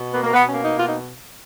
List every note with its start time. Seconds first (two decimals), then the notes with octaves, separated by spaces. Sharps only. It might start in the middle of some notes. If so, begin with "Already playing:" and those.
Already playing: B2
0.13 A#3 B3
0.24 A#3
0.34 B2 B3
0.49 A#3 C#4
0.64 D#4
0.74 B2 F4
0.88 D#4